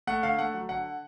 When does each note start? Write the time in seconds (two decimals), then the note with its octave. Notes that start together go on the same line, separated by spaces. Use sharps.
0.07 A3 F#5
0.23 D3 F5
0.39 A3 F#5
0.54 F#3
0.69 D3 F#5